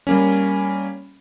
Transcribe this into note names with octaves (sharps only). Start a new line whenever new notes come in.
G3 A#3 C#4